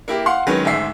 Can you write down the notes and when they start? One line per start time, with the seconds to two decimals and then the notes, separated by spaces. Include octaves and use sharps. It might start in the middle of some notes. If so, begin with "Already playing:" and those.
0.08 A#3 E4 G4
0.26 F5 F#5 C6
0.47 D#3 F#3 G#3 C#4 B4
0.65 D2 G#2 E5 C7